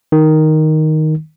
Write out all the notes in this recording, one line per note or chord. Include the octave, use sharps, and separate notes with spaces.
D#3